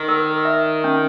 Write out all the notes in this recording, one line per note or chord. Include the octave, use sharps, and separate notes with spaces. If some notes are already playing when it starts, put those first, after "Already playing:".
Already playing: D#3
A#4
E5
C#4